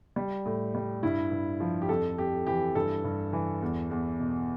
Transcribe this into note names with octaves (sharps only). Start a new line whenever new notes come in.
G3
A2
G3
G2 E4
G2
F3
G4
F2 A4
F2 G4
E3 G4
G2 A4
G2
E3
E2
E2
B2